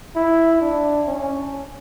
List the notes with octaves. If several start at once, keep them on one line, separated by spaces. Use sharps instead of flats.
E4
D4
C#4